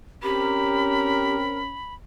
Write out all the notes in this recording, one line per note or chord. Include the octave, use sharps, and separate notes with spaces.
C4 C#4 G4 A#4 B5